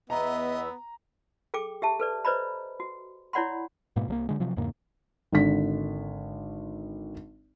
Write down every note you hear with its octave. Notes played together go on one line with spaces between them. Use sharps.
E2 B3 D#5 E5 A#5
G#4 A4 G5 D6
G4 E5 A5
A4 B4 D5
B4 C5 D5 D#5 A#5 B5
F#4
E4 C#5 D5 F#5 B5 C6
G#2 B2 A#3 B3
C2 F3 A#3
D3 G#3
C3 F3 F#3
E2 G#2 C#3 A#3
G#1 D3 B6